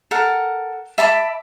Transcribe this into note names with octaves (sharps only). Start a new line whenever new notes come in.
A4 A#4 F#5
E5 A5 B5 D6